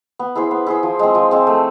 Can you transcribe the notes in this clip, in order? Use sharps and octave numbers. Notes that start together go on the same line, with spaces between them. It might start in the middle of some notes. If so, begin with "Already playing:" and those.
B3
E4 G#4 C5
B3
E4 G#4 C5
F3
G#3 C4
F3
G#3 C4
A3